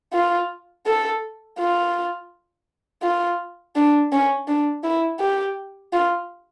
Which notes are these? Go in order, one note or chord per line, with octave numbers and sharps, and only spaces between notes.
F4
A4
F4
F4
D4
C#4
D4
E4
G4
F4